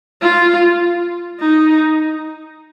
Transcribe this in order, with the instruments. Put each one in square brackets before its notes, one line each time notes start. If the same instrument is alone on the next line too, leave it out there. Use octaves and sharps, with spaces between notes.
[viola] F4
D#4